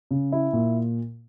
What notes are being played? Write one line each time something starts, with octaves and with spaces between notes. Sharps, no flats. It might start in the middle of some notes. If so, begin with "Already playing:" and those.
C#3
E4
A#2